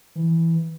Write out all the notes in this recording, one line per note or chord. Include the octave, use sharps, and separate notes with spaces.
E3